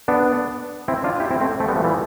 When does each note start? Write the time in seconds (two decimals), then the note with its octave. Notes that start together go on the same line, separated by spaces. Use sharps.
0.08 B3 D4
0.88 C4 E4
1.04 D4 F4
1.20 E4 G4
1.31 C4 E4
1.41 A3 C4
1.60 A3 C4
1.68 G3 B3
1.76 F3 A3
1.84 E3 G3